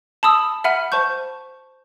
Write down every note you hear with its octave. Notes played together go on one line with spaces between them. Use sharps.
A5 B5 D#6 E6
E5 F#5 B5 F6 D#7
C5 A5 C#6 G6